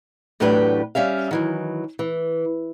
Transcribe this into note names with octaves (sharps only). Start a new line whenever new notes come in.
E2 A2 F#3 D4 G4 B4
G3 C#4 E5 F5
D#3 E3 F#3
E3